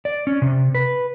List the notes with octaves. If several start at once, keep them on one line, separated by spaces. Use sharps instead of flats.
D5
C#4
C3
B4